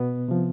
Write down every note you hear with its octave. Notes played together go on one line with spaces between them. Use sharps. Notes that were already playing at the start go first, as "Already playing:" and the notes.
Already playing: B2 B3
C3 F3